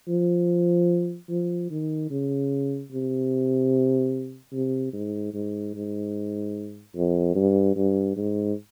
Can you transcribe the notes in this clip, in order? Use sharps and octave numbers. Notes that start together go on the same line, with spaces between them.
F3
F3
D#3
C#3
C3
C3
G#2
G#2
G#2
F2
G2
G2
G#2